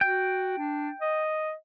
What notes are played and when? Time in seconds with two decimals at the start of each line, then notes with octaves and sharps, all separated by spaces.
0.01 F#4 G5
0.58 D4
1.01 D#5